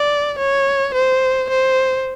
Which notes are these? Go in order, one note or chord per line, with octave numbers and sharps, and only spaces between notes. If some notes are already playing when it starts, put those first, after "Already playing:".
Already playing: D5
C#5
C5
C5